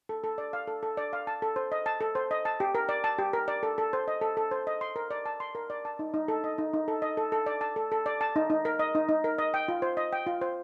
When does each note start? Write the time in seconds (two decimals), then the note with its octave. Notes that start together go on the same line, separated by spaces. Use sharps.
0.09 A4
0.24 A4
0.38 D5
0.53 F5
0.67 A4
0.83 A4
0.97 D5
1.13 F5
1.27 A5
1.42 A4
1.56 C5
1.72 D#5
1.86 A5
2.01 A4
2.15 C5
2.31 D#5
2.45 A5
2.60 G4
2.75 A#4
2.89 D5
3.04 A5
3.18 G4
3.33 A#4
3.48 D5
3.63 A4
3.78 A4
3.93 C5
4.08 D#5
4.21 A4
4.37 A4
4.51 C5
4.67 D#5
4.81 C6
4.96 A#4
5.11 D5
5.26 A5
5.40 C6
5.55 A#4
5.70 D5
5.85 A5
5.99 D#4
6.14 D#4
6.28 A4
6.44 D#5
6.58 D#4
6.74 D#4
6.88 A4
7.02 D#5
7.17 A4
7.32 A4
7.46 D5
7.61 A5
7.76 A4
7.92 A4
8.06 D5
8.21 A5
8.36 D#4
8.50 D#4
8.65 A#4
8.79 D#5
8.95 D#4
9.09 D#4
9.24 A#4
9.38 D#5
9.54 G5
9.68 F4
9.82 C5
9.97 D#5
10.13 G5
10.27 F4
10.41 C5